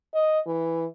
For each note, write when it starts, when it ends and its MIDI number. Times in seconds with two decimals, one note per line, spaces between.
0.14 0.40 75
0.46 0.85 52